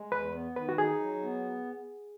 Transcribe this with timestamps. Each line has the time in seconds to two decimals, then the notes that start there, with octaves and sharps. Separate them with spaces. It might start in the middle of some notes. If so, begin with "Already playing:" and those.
Already playing: G#3
0.12 E2 B4
0.34 B3
0.56 D#3 B4
0.69 F#4
0.78 D#4 G#4
1.00 F#3
1.23 B3